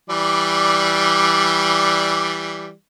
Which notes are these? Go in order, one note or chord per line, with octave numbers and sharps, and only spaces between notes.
E3 G3 D5